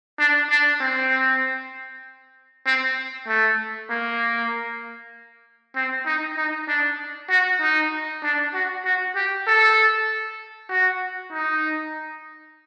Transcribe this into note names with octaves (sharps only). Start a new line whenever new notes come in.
D4
D4
C4
C4
A3
A#3
C4
D#4
D#4
D4
F#4
D#4
D4
F#4
F#4
G4
A4
F#4
D#4